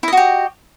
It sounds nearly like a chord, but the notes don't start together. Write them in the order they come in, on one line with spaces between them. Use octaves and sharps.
E4 D#5 F#4 G4